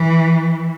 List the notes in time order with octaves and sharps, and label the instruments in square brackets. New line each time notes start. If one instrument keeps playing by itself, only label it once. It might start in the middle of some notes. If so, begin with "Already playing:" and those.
Already playing: [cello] E3